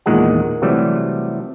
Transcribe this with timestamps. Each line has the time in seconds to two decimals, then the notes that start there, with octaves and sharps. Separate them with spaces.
0.06 E2 A#2 D#3 G#3 G#4 F#5
0.62 C3 E3 F#3 G3 A3